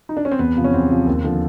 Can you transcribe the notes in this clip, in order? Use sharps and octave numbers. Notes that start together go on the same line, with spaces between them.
D#4
D4
C#4
C4
E2 B3
C3 F3
C#4
E2 C4
C3 F3
D#2
D3 F3